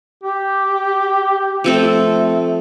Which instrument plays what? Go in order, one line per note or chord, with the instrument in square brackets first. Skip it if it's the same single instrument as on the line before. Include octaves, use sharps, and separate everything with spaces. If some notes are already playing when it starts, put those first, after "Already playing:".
[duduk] G4
[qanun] F3 C4 A4 [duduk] A3